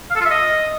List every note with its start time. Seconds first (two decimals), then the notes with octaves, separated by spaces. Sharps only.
0.10 F5
0.15 A4
0.20 F4
0.25 E5
0.31 D#5